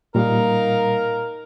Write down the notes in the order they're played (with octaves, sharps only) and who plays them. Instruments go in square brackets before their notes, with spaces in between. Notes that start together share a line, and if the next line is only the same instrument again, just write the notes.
[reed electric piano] A#2 G3 [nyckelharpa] D#4 F5 [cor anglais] A#4